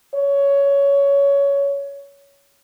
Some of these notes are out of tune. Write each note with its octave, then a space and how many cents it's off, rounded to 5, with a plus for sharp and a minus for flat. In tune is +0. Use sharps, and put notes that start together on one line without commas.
C#5 +15